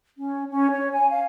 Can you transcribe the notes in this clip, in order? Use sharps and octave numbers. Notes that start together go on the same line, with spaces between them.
C#4
C#4
C#5
G#5
F5